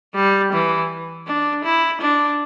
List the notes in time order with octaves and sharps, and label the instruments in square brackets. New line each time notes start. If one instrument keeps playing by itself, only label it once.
[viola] G3
E3
D4
E4
D4